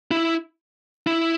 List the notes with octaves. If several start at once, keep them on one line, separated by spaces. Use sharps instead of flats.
E4
E4